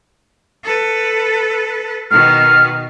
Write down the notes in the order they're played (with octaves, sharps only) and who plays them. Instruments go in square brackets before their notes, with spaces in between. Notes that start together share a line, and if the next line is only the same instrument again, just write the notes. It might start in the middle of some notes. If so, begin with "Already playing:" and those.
[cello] A4 B4
[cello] B2 D#3 [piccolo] F6